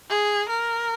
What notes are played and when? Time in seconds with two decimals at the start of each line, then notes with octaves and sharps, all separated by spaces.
0.10 G#4
0.49 A#4